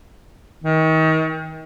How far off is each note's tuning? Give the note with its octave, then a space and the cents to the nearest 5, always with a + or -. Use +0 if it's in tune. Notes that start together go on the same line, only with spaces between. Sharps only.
D#3 +35